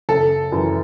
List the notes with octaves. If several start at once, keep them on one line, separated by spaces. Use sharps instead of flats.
F#1 A4
F#2 E3